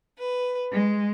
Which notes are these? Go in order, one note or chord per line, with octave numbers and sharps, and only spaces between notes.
B4
G#3